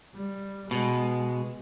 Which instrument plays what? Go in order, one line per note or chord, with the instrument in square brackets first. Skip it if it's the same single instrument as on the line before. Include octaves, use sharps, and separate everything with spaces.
[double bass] G3
[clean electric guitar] B2 [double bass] G#3